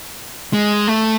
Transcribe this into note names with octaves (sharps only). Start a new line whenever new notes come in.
G#3
A3